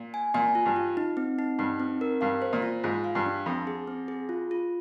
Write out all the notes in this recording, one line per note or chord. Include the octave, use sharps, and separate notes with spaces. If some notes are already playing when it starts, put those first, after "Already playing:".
Already playing: A#2
G#5
A#2 G#5
F4
G2
F4
D#4
C4
D#4
G2 D#4
C4
A#4
G2 F5
C5
A#2
F4
G#2 F4
F5
G2
D4
F2 C4
G#4
C4
G#4
F4
F4